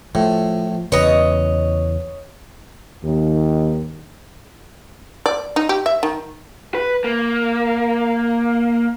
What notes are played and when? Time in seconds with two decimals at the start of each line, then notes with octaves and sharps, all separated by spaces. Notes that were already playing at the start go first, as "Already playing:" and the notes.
0.15 A2 F3
0.92 E2 C#3 B4 C#5 D#5
3.03 D#2 D#3
5.26 D5
5.56 D#4
5.69 G4
5.86 E5
6.03 D#3
6.75 B4
7.04 A#3